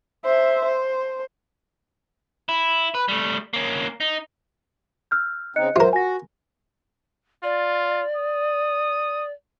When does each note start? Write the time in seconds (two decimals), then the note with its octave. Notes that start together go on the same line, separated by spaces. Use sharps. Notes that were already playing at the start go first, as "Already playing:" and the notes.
0.25 C5 E5
0.65 C5
2.49 E4
2.94 B4
3.08 G3 A3
3.53 A#3 C#4
4.00 D#4
5.11 E6 F6 G6
5.56 C#3 C4 D#4 D#5 F#6 C#7
5.76 F#3 F4 A#4 C5 E5
5.93 F#4 G#5 A#6
7.43 F4 D5
8.16 D#6